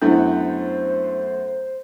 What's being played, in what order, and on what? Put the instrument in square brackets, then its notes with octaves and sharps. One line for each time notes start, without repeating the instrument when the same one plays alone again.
[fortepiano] F#2 A3 B3 [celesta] D4 E4 [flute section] C5